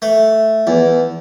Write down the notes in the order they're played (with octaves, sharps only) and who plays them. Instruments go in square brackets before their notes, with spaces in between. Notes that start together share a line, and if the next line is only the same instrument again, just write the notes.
[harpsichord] A3
E2